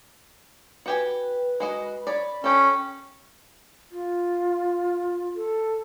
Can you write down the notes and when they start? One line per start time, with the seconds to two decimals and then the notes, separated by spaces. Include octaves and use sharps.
0.86 F#4 G4 B4 G#5
1.60 G#3 F#4 D#5
2.07 C#5 D5 B5
2.44 C#4 G4 A4
3.92 F4
5.36 A4